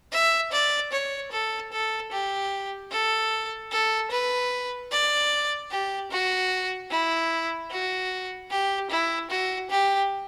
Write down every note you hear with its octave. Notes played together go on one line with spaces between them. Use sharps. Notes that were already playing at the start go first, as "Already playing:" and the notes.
E5
D5
C#5
A4
A4
G4
A4
A4
B4
D5
G4
F#4
E4
F#4
G4
E4
F#4
G4